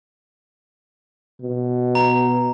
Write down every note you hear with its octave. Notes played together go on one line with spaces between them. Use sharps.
B2
A#5